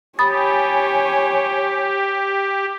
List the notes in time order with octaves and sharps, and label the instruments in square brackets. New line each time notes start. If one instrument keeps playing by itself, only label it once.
[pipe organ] G4 [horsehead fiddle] C#5 G#5 [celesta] B5 D#6 A6